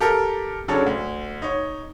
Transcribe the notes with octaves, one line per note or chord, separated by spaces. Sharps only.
G4 A4 A#4
C#3 F#3 D4 A4 C#5
D2
D#4 C#5